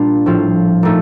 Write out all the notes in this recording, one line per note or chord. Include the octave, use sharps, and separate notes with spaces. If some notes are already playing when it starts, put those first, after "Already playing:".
Already playing: A#2 G3 D4 F4
A2 F3 C4 F4
A#2 A3 D#4